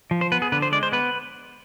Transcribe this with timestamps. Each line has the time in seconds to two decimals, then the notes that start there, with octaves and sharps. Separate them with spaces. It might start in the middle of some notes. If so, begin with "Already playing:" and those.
0.11 F3
0.21 C5
0.32 B3 B4
0.42 G#4
0.52 D3 B4
0.62 C5
0.72 G#3 D5
0.83 C5
0.92 B3 B4